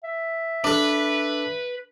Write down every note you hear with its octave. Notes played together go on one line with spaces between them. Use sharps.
E5
D4 A4 B4